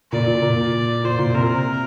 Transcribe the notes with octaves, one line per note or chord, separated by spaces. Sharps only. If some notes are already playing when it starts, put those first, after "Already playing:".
A#2 D5
A#2
A#2
A#2 C5
A#2
C3 A#4